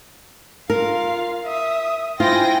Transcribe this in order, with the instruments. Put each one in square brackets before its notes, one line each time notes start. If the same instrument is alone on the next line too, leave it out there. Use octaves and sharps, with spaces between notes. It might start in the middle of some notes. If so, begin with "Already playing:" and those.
[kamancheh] F4 F5 [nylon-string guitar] A#4
[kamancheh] E5 D#6
[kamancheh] E4 C5 [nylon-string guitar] F4 [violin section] G5 G#5 A#6